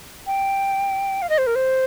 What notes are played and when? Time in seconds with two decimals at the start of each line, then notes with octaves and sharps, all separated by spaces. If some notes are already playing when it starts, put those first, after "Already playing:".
0.27 G5
1.22 F5
1.30 D#5
1.38 C5
1.47 A#4
1.55 C5